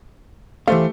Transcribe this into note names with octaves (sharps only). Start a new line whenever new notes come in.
E3 A3 G4 C5 F5